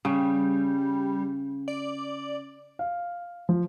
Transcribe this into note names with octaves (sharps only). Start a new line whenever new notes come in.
C#3 G3
D5
F5
F3